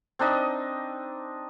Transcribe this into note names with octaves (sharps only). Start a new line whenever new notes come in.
C4 D4 D#4 D#5